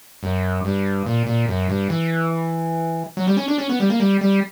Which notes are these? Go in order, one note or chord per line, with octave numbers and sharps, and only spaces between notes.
F#2
G2
A#2
A#2
F#2
G2
E3
F#3
G3
C#4
D4
C#4
B3
G3
A#3
G3
G3